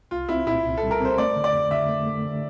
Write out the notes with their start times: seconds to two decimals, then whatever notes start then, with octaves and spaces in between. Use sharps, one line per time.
0.11 C2 F4
0.29 C4 E4
0.46 A#2 E4
0.64 C2
0.77 A4
0.83 G3
0.91 A#4
1.00 C4 C5
1.18 A3 D5
1.36 D3
1.44 D5
1.53 F2
1.71 D3 E5
1.89 A3
2.06 A3
2.25 D3